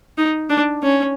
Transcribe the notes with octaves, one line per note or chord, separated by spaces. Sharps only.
D#4
D4
C#4